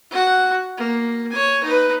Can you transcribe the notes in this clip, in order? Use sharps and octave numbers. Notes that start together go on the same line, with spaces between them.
F#4 F#5
A#3
C#5 G#5
D#4 B4